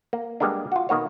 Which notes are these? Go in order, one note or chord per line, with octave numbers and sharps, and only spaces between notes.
A#3
G3 G#3 A#3 B3 D4
F4 F#4
B2 D#3 A#3 F#4 C#5